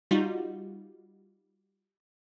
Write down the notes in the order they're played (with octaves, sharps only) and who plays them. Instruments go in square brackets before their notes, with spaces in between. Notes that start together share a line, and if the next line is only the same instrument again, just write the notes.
[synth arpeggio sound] G3 D#4 F4 F#4